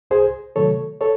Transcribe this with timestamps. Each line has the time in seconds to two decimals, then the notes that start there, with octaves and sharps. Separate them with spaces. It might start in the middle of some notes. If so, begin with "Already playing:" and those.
0.11 C2 G#4 C5
0.56 C3 D#3 F#3 A3 A4 C#5
1.01 A4 C#5